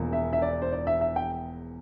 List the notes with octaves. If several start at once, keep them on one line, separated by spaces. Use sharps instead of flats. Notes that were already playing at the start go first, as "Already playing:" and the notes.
Already playing: E1 E2 F3 A#3
E5
E5
D5
C5
D5
E5
E5
G5